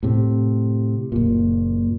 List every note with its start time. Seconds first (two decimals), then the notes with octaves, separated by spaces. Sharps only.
0.03 A2 C3
1.12 F#1 A#2